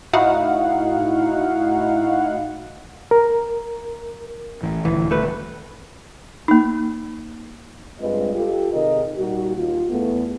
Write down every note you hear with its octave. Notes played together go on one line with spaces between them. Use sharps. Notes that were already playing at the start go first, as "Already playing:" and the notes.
A2 D#4 E4 F#4 F5 F#5
A#4
A1 E3
D#1 D2 E3
A3 B4
A#3 D#4
G2 G#3 C4 F4 B4 D#5
F4 G4 A4
C3 D#3 G#4 A#4 D#5
A#2 G3 D#4 F#4
D#2 F4
E2 A3 B3